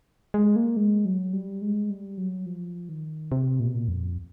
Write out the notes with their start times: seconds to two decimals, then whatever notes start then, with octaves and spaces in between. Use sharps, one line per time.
0.34 G#3
0.56 A#3
0.77 G#3
1.05 F#3
1.33 G3
1.62 G#3
1.90 G3
2.18 F#3
2.46 F3
2.89 D#3
3.32 C3
3.60 A#2
3.67 B2
3.75 A#2
3.88 F2